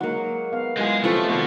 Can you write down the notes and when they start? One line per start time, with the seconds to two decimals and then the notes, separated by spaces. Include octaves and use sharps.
0.01 F#3 G#3 A#3 D#4 F#5
0.53 B3 F5
0.77 F#3 G#3 E4 F4 G#4
1.04 F3 A3 C4 F4 G4 C#6
1.30 C3 D#3 B3 F#4